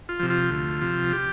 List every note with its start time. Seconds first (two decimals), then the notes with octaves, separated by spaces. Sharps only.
0.09 F4
0.19 C3 F3
0.30 F4
0.51 D2
0.81 C3 F3
1.13 G4